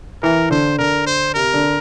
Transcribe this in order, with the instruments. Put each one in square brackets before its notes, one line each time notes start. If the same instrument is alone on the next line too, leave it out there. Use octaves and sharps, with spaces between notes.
[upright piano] E3 [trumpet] A#4
[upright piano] D3 [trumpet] C5
[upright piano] D3 [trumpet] A#4
[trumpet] C5
[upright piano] C3 [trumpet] A#4
[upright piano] D3